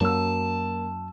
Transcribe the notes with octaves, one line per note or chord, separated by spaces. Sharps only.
F#2 F#3 A#3 A5 E6